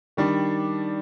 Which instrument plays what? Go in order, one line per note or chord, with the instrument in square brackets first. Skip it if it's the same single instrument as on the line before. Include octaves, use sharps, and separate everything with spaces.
[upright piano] D#3 G3 D4